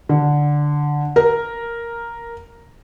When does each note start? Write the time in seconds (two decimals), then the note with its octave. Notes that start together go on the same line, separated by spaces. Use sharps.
0.09 D3
1.16 A#4